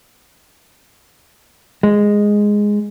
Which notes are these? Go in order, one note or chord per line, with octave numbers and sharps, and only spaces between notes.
G#3